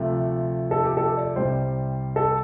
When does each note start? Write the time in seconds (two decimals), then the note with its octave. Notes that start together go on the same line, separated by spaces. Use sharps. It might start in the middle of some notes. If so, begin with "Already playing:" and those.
Already playing: D2 C3 F3 A3
0.71 A4
0.84 G4
0.97 A4
1.17 D5
1.36 C2 C3 G3 C5
2.16 A4